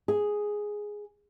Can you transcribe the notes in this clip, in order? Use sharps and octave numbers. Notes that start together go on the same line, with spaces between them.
G#4